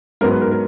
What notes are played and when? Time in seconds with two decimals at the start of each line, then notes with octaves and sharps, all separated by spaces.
0.21 G#2 F#3 B3 A#4
0.31 B4
0.41 A#4
0.51 A#4